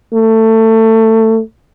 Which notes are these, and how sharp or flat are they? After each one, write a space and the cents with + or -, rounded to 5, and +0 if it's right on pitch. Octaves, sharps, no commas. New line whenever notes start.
A3 +20